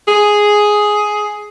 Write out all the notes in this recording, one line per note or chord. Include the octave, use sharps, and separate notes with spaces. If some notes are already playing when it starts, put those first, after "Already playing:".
G#4